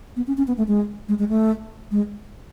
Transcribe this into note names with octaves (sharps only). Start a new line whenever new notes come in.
B3
C#4
C#4
B3
A3
G#3
G#3
G#3
A3
G#3